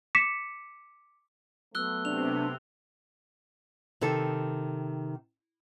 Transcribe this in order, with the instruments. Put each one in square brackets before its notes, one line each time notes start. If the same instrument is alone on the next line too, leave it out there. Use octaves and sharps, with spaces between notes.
[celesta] D6 B6 C#7 E7
[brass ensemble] F#3 A3 B3 [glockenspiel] E6 F#6 G7
[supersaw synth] C3 [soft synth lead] D4 [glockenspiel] F7
[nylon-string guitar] C3 D#3 A4